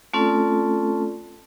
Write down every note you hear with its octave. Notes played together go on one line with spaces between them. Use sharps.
A3 C4 C#4 F4 A4 D5